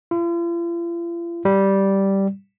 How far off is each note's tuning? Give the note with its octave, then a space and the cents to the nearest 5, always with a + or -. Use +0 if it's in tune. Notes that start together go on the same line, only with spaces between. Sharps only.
F4 -45
G3 -5